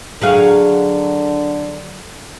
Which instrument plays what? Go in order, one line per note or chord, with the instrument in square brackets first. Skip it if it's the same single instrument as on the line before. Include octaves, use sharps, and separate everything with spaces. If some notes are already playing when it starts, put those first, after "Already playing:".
[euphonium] D3 [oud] F#3 G#4 F5